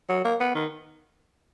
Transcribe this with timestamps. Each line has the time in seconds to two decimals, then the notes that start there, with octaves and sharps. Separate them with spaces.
0.09 F#3
0.24 A#3
0.40 B3
0.55 D#3